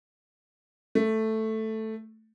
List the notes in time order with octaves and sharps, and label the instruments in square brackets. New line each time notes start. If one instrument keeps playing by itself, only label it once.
[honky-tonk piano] A3